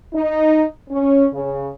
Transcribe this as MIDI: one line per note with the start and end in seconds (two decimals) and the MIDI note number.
0.14 0.64 63
0.90 1.25 61
1.33 1.69 49